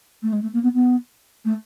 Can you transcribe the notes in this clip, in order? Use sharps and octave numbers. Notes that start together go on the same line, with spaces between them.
A3
G#3
A3
A#3
B3
B3
A3